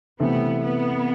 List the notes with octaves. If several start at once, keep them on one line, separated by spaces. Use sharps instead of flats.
C3 E3 A3 B3
B3